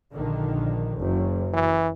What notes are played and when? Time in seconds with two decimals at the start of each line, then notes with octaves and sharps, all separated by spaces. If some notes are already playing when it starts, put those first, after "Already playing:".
0.12 A#1 D3 D#3
1.01 F#1
1.54 E3